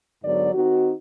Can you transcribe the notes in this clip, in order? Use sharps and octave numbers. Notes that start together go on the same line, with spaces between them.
G#2 D3 F#3 B3 D5
D#3 C4 D#4 F#4